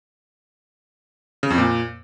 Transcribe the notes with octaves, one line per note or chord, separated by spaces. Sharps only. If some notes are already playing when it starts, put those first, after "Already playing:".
C#3
F2
A#2